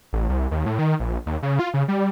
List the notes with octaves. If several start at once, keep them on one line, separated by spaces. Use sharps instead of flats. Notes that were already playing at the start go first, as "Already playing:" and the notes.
A1
C2
D#2
A2
D#3
A#1
D#2
C#3
F4
C#3
G3